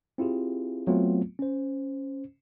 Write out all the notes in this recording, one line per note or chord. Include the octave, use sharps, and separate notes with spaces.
C4 E4 F4 G4 G#4
F#3 A3 B3 C4 F4
C#4 C5